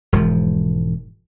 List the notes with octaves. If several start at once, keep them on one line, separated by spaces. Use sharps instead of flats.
E1 G#2 E3 F3